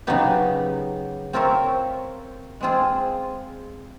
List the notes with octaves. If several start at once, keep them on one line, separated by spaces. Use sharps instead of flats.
C#3 F#3 B3 D#4 G4
C4 F4 A#4 C#5 E5
G#3 C4 F4 G#4